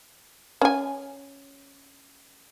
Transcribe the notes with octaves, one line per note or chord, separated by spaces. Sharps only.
C#4 G#5